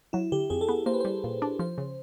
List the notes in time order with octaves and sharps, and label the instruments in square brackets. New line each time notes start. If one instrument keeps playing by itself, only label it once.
[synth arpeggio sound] F#3 [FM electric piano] E4
[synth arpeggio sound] D3 [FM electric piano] G4
[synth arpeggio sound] F2 [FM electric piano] G#4
[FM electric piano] A4
[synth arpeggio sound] B3 [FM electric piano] G#4
[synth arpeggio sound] A#3 [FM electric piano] C5
[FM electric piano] B4
[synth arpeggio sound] G3 [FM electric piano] C5
[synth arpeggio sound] A#2
D4
[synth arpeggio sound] F3 [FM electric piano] C5
[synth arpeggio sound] C#3